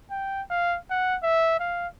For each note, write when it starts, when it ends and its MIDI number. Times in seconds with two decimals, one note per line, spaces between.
0.11 0.42 79
0.50 0.77 77
0.90 1.17 78
1.23 1.58 76
1.59 1.87 77